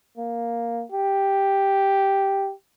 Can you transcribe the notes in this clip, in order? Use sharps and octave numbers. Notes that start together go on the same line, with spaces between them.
A#3
G4